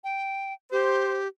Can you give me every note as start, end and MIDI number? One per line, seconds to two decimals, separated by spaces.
0.04 0.53 79
0.72 1.28 67
0.72 1.16 72